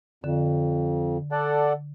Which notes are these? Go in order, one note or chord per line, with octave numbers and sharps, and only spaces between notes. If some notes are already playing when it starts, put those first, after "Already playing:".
F2 D3
A4 D5 F#5